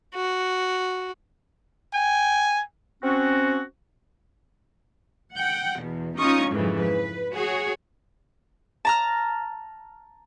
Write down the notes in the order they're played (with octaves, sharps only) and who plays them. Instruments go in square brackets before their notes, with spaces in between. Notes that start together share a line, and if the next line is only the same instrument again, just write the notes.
[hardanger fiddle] F#4
[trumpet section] G5 G#5
[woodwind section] C4 C#4 F#4
[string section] F#5 G5
E2 B2
C#4 D#4 F4 C#6 D#6
F2 G#2 C#3 E3 F#3
B4
F#4 G#4 C#5
[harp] A5 A#5 F6